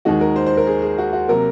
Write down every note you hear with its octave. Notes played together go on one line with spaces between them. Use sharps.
D#2 D#3 G#3 F#4
A#4
C5
C5
A#4
G#4
G#4
F#4
F#4
C3 F#3 A#3 A#4